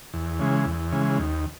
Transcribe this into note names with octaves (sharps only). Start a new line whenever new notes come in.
E2
C#3 E3 G#3
E2
C#3 E3 G#3
D#2